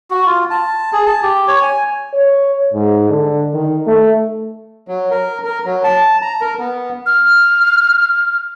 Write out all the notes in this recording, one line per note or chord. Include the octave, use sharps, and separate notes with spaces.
F#4
F4
A5
G#4
A5
G4
C#5
G#5
C#5
G#2
D3
D#3
A3
F#3
A#4
A#4
F#3
A5
A#5
A#4
B3
F6